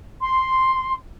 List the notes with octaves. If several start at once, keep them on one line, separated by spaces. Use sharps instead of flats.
C6